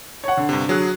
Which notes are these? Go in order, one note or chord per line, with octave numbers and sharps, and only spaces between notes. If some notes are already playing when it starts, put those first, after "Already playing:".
C#5 F#5
D3
G2 C3
F#3 G#4 F#6